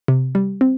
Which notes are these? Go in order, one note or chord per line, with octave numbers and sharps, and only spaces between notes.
C3
G3
C4